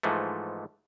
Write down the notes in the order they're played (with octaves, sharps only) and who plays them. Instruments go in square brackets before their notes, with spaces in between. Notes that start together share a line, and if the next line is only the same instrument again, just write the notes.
[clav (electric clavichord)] G#2 E3 F3 A3